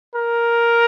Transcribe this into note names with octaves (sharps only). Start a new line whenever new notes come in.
A#4